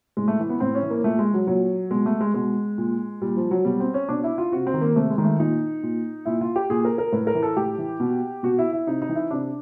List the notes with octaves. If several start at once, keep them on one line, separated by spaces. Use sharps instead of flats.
A2 G#3
A3
E3
B3
A2 C4
C#4
E3
A#3
A#2 A3
G#3
F#3
A#2 F#3
B2 G#3
A3
G#3
B2 G#3
A#2
A#2 G3
F3
F#3
B2 G3
C4
C#4
B2 D4
E4
F4
C3 F#4
C4
D#3
A#3
C3 A3
G#3
D#3
A3
A#2 D#4
A#2
A#2 E4
F4
G4
A#2 G#4
A#4
A#4
A2 B4
A#4
E3
A4
A2 G4
E3
B2
B2 F#4
E4
E4
C3 D#4
D#4
E3
E4
C3 D4